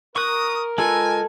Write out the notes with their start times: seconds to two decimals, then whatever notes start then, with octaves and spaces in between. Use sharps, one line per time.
0.16 A#4 C#6 D#6 F#6
0.78 G#3 F4 A4 B4 G#5